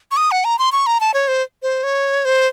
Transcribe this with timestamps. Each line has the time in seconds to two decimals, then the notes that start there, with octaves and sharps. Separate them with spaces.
0.11 C#6
0.17 D#6
0.31 F#5
0.45 A#5
0.59 C6
0.72 C#6
0.86 A#5
1.00 A5
1.14 C#5
1.28 C5
1.62 C5
1.83 C#5
2.25 C5